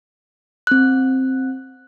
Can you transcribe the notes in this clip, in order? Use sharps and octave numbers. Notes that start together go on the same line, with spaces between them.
C4 F#6